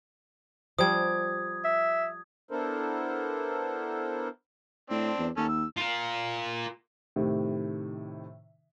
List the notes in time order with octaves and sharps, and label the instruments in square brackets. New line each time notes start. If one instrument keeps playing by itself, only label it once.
[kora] F3 G3 [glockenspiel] D#6 G#6
[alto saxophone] E5
[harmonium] B3 D4 E4 A4 A#4 C5
[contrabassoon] A2 [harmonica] C4 D4
[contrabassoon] E2
[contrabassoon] D#2 [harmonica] C#4 A4
[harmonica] E6
[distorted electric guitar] F4 A#4
[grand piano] A2 C3 D#3